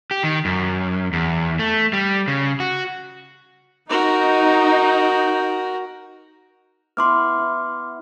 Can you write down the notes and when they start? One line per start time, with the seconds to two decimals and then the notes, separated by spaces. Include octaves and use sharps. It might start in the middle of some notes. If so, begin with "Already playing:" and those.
0.11 G4
0.23 D#3
0.45 F#2
1.13 E2
1.59 A3
1.93 G3
2.28 C#3
2.60 F#4
3.89 D#4 F#4 A#4
6.97 B3 E4 C6 D6 F6
7.39 E4